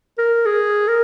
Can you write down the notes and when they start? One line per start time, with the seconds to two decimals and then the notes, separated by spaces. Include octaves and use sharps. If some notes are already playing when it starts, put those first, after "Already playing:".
0.18 A#4
0.46 G#4
0.88 A#4